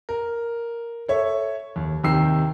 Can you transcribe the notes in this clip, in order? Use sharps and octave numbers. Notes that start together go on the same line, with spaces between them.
A#4
A4 C#5 E5
D#2
D#2 C3 D#3 G5 E6 C7